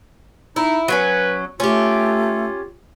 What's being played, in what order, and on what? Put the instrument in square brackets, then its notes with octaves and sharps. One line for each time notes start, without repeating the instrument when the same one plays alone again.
[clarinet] D#4 [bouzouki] E4
[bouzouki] F#3 B3 C#4 [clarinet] B4
[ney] A3 [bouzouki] C#4 G4 [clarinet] F4